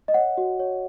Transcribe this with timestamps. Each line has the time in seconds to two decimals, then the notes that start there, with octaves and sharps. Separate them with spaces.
0.08 D#5
0.14 C#5 F#5
0.38 F#4
0.59 C#5